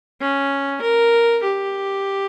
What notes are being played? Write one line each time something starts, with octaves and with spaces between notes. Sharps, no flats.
C#4
A#4
G4